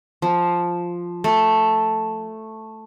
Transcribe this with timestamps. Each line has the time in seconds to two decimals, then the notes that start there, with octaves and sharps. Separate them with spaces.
0.22 F3
1.24 A3